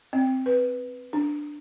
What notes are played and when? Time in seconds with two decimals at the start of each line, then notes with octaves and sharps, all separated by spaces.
0.13 C4
0.46 B4
1.13 D4